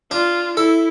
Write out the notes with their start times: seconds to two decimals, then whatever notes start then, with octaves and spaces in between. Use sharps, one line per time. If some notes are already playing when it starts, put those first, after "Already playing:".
0.11 D4 F4
0.57 E4 A4